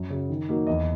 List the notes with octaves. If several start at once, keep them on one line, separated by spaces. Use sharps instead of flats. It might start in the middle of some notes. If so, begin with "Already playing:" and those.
Already playing: F#2
C#3 F#3
D#3
F#3 A#3 D#4
E2 D#5